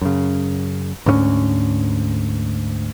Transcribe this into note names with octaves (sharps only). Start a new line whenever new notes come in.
F#2 C#3
D2 G#2 A#3 C#4